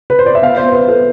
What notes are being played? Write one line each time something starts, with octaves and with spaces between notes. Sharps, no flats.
B4
C5
D5
E5
B3 F5
B3 C5
B4
B3
A4